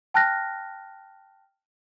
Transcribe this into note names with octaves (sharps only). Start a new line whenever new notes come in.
G5 A5 F6 F#6 A#6